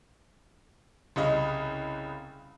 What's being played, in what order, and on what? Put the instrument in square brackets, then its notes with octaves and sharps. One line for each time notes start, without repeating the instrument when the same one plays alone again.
[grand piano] C2 C#3 D#5